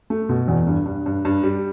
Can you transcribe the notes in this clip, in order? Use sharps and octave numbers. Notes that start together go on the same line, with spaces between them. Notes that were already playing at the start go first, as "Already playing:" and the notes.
A3
B2
E2
G2
G2
G2
G2
G3